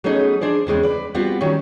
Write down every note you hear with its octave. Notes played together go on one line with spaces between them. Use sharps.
F#3 A3 B3 C#4 D#4 G#4
D4 G#4 C5 D5
E2 C#3 G#3 C4
B4 D5
G3 B3 C4 F4 F#4
D#3 F#3 G3 C#4